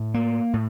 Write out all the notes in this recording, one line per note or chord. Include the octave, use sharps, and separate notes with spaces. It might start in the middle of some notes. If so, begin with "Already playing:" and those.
Already playing: A2
A#3
A2